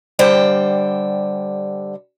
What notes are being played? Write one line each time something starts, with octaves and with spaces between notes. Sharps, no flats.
D3 G3 C5 F#5 G5